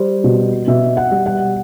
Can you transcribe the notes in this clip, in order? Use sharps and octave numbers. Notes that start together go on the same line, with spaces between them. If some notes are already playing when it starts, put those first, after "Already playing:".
Already playing: G3 C5
B2
B2 E5
F#5
G3
F#5